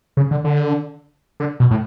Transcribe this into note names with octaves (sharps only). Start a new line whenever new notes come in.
C#3
D3
D3
D3
B2
A2